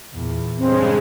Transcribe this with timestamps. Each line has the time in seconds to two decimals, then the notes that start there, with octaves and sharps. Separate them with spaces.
0.14 E2 A#2
0.59 G2 C#3 G#3 C4